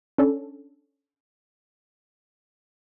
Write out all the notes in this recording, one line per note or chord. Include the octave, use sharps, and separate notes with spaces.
C#4 D4 A4